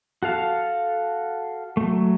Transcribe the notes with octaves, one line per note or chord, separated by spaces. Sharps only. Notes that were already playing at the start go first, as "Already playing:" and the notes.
F#4 A4 F5 A5
F#3 A3